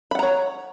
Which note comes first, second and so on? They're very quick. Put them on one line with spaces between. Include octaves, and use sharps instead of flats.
B5 F#5 A#5 C#5